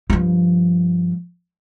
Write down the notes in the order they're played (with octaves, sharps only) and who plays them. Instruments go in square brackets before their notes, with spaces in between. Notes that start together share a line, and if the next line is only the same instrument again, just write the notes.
[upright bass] G2 F3